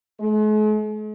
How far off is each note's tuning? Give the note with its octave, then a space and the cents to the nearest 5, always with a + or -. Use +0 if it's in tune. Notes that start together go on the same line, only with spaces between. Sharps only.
G#3 +45